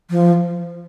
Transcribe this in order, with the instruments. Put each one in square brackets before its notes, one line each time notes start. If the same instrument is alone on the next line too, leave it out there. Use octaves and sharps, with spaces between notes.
[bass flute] F3